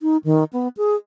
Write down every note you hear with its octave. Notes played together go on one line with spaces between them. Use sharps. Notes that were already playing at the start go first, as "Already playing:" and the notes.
D#4
D#3
B3
G#4